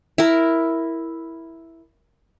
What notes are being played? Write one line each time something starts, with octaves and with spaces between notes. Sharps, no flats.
E4 A#4